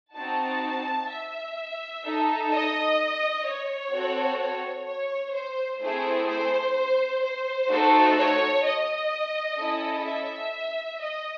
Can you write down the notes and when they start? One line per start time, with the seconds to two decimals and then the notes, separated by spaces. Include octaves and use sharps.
0.16 C4 D#4 F#4 A5
1.11 E5
2.05 D#4 A4
2.52 D#5
3.47 C#5
3.93 C4 F#4 A4
4.41 C#5
4.87 C#5
5.35 C5
5.82 A3 C4 E4 G#4 C5
6.29 C5
7.23 C5
7.70 A3 D#4 F#4 A4
8.17 C#5
8.64 D#5
9.58 C#4 E4 A4
10.05 E5
11.00 D#5